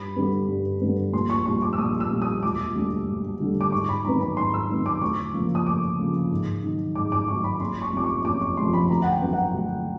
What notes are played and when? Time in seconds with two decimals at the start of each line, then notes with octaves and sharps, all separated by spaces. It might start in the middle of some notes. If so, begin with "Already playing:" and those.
Already playing: G2 B5
0.16 D3 G3 B3
0.48 G2
0.81 D3 G3 B3
1.13 A#1 C6
1.30 C#6
1.46 A#2 G3 C#6
1.62 D6
1.73 E6
1.78 A#1 D#6
2.00 E6
2.10 A#2 G3
2.22 D#6
2.43 E1 D6
2.75 D2 D3 G3
3.07 E1
3.40 D2 D3 G3
3.61 D6
3.72 G#2 C#6
3.89 B5
4.05 D#3 F#3 B3 A#5
4.21 B5
4.37 G#2 C6
4.54 E6
4.69 D#3 F#3 B3
4.86 D6
5.01 D2 C#6
5.34 C#3 F3 A#3
5.55 D#6
5.66 D2 D6
5.99 C#3 F3 A#3
6.31 G#2
6.64 D#3 F#3
6.95 G#2 D6
7.12 D6
7.28 D#3 F#3 C#6
7.44 B5
7.60 F#1 C6
7.82 C#6
7.93 F2 C3 F3 D6
8.04 C#6
8.25 F#1 D6
8.41 C#6
8.57 F2 C3 F3 C6
8.73 B5
8.89 D2 A#5
9.02 F#5
9.11 G5
9.22 D3 F#3 B3
9.33 F#5
9.54 D2